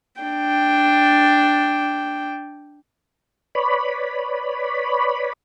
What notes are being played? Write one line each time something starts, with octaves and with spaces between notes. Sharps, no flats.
D4 G5
B4 C#5 D5 B5